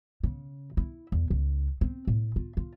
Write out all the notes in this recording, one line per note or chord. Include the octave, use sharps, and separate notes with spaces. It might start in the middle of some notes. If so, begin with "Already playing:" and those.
C#3
E4
E2
C#2
C4
A2
F4
F4